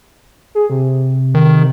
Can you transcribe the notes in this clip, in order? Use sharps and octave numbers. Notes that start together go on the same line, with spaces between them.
G#4
C3
D#3